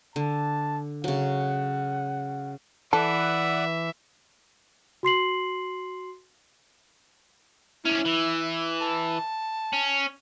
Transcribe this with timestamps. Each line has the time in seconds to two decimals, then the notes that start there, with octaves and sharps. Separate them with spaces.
0.16 D3 A5
1.04 C#3 F#3 F#5
2.93 E3 A4 B4 D5 E5 F#5
5.03 F#4 C6 C7 F#7
7.85 C#4 D4 E4
8.05 E3
8.81 A5
9.73 C#4